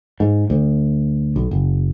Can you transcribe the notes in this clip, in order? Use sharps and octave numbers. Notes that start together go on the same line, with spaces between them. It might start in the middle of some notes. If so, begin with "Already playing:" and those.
G#2
D2
B1
F#1